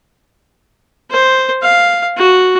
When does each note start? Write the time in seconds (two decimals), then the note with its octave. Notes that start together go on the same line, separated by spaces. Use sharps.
1.11 C5
1.62 F5
2.17 F#4